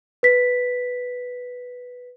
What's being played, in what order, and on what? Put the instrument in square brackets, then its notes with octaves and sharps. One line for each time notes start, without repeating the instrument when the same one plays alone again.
[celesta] B4 B6